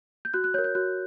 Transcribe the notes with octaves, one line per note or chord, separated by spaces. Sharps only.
G6
F#4 F#6
F#6
A#4 C#5 G6
G6
F#4 F#6